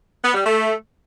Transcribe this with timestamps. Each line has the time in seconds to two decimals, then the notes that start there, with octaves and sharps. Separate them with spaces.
0.24 B3
0.34 G3
0.45 A3